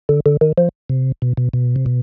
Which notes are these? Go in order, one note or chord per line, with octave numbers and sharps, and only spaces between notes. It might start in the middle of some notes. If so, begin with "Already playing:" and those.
D3
D3
D#3
F3
C3
B2
B2
B2
C3
B2